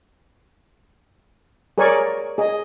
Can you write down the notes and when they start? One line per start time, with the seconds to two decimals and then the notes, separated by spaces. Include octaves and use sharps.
1.78 G#4 A#4 C#5 D5 G#5 C#6
2.38 G#4 D#5